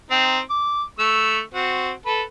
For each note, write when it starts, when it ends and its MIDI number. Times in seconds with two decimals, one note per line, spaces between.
0.11 0.39 60
0.11 0.39 63
0.50 0.83 86
0.99 1.41 57
0.99 1.41 85
0.99 1.41 88
1.54 1.91 60
1.54 1.91 66
2.06 2.22 69
2.06 2.22 71